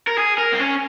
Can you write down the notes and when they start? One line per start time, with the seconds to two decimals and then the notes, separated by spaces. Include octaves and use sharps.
0.07 A#4
0.18 G#4
0.38 A#4
0.52 C4
0.59 C#4